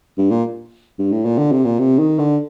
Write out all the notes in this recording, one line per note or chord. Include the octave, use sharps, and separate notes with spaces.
G2
A#2
G2
A2
A#2
D3
C3
A#2
C3
D#3
D3